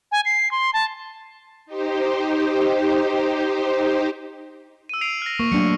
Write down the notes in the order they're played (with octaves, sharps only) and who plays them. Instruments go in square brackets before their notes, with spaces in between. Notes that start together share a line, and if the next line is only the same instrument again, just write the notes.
[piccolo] G#5
C7
C6
A5
[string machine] D#4 G4 C5
[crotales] E6 D#7
C7 D7 F7
F6 A#6
[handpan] A#3 [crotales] C#6
[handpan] F#3 A3 D4 [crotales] C#7